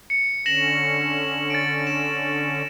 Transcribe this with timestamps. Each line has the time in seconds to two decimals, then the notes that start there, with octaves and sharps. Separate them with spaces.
0.10 C#7
0.46 D3 C#4 A#6 E7 F#7
1.50 A6 D7
1.87 E7